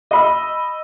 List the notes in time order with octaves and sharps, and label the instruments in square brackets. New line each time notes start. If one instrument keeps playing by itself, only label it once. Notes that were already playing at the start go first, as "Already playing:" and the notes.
[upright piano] D#5 B5 E6